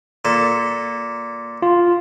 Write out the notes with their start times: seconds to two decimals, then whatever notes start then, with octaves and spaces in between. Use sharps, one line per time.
0.25 A#2 A4
1.62 F4